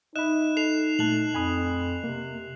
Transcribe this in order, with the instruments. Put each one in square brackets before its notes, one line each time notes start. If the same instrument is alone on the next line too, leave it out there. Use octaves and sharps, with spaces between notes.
[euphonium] D#4 [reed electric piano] D#5 E5 B5 [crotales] F#6 E7
[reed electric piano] A4 [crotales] C7 F7
[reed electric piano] A#2 A3 A5 [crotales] F#6 F#7
[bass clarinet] F2 [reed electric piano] G#5 B5 D#6
[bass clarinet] C3 [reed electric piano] A#3